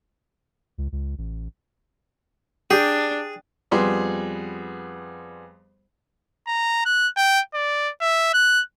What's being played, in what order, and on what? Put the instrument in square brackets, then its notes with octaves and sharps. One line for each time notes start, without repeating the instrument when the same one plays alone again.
[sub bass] C#2
C#2
A1
[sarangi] D4 [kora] G4 [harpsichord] G#4
[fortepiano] F2 G3 B3 G#4 C6
[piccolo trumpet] A#5
F#6
G5
D5
E5
F#6